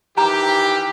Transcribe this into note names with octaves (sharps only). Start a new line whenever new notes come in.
D#3 E3 G4 A#5